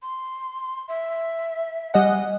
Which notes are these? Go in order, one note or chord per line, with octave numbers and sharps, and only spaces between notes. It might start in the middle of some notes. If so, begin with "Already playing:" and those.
C6
E5
G3 D#5 F#5 G#5